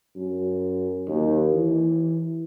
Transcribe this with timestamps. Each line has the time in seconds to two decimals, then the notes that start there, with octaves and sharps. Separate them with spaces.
0.16 F#2
1.08 D#2
1.53 E3